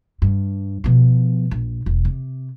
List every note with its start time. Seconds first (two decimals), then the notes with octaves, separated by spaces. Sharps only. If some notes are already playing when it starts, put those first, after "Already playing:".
0.22 G2
0.84 B2 F3
1.51 A#1
1.86 E1
2.05 C3